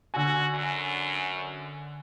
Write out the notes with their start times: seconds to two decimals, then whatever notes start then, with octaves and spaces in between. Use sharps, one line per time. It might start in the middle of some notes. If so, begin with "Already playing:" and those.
0.14 D3 F#4 G#5
0.55 F#2